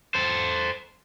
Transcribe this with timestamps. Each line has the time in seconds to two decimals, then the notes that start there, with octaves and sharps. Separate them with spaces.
0.15 A4 C5